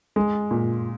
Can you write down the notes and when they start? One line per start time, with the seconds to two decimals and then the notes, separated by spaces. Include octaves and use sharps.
0.16 G#3
0.51 A#2